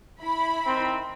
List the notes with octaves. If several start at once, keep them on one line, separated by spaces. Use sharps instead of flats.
E4 B5
D#3 C4